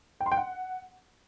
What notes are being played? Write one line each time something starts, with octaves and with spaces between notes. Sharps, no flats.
G5
C6
G5
F#5